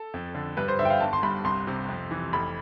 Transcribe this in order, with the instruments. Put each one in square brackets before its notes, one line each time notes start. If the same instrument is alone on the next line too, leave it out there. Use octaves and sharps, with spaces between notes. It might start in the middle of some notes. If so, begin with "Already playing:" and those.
Already playing: [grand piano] A4
F2
D3
G2 B4
C5
D3 E5
G5
F5
G1 A5
C6
G2 B5
C2 C6
C3
F2
E3
F1 B5